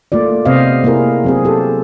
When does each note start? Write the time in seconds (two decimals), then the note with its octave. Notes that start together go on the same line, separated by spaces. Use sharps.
0.12 A3 A#3 F4 D5
0.45 C3 B3 C4 C5 D#5 F5
0.84 A#3 C4 E4 G#4 A#4
1.24 F#3 C4 G#4
1.45 G4 A4